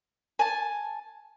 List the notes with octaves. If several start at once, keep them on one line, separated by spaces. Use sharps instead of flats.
G#5 A5